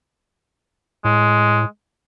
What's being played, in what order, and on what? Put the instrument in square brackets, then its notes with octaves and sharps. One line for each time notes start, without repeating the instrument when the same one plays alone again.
[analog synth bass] A2 [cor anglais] G#3